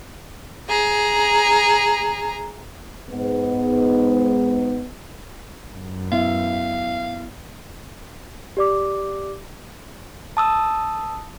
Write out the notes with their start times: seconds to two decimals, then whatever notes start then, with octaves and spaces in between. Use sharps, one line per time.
0.69 G#4 A#5
3.10 G#2 B3
5.73 F#2
6.12 B3 E4 E5 F5
8.57 G4 D5 D6
10.37 A5 D#6 E6